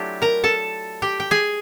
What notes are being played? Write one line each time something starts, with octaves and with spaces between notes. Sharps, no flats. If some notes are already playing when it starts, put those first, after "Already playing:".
Already playing: F#3 A3 D4 E4 F4 G4
A#4 A#5
A4 A5
G4 G5
G5
G#4 G#5